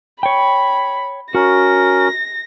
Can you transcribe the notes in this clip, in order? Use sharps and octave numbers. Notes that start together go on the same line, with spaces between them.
C#5 G5 B5
C#4 F#4 A#4 A#6